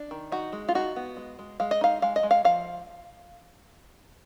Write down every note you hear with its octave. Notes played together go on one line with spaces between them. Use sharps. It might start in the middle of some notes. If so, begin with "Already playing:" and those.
Already playing: D4
D#3
D#4 F#4
G#3
F4
D#4 F#4
B3
G#3
G#3
G#3 F5
D#5
D#4 F5
G#3 F5
D#5
G#3
F5
F3 F5